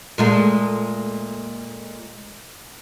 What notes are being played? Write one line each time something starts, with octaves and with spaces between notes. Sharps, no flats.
A#2 G#3 A3